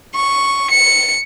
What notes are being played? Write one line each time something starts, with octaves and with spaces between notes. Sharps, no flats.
C#6
C#7